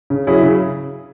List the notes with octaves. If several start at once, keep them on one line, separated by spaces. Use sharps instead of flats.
C#3
F#3 C#4 E4 G#4
C#3